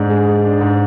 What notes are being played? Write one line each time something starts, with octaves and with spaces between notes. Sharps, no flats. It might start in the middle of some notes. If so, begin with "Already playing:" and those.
Already playing: G#2 D4
G#3
G#3
D4
G#2